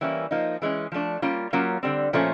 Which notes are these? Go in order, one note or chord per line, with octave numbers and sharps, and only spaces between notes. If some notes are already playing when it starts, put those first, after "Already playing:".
E3 G3 A#3 C#4 E4
F3 A#3 D#4
E3 G#3 C#4
F3 A3 D4
G3 A#3 C#4 F4
F#3 A#3 C#4 F4
D3 G3 C4
A#2 F3 A3 C#4